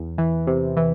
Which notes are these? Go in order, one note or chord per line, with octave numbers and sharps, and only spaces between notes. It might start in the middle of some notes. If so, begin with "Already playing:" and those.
Already playing: E2
E3
C3
E3